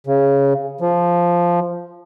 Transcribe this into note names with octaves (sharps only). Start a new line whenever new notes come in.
C#3
F3